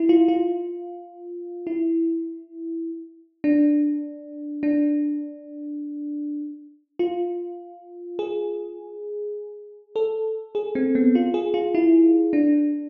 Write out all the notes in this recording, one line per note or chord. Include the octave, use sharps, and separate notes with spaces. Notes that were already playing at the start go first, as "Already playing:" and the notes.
Already playing: E4
F4
F4
E4
D4
D4
F4
G#4
A4
G#4
C4
B3
F4
G#4
F4
E4
D4